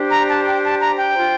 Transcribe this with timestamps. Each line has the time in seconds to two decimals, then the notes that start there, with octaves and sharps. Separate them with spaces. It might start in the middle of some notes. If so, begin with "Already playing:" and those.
Already playing: D4 G4 C5
0.11 A#5
0.28 A5
0.45 G5
0.63 A5
0.80 A#5
0.97 G5
1.15 F4 C5